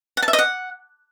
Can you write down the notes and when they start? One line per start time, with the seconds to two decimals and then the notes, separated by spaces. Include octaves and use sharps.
0.17 F#5
0.23 A5
0.28 E5
0.33 D#5
0.39 F#5